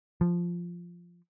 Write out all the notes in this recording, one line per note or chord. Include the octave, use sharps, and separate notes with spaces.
F3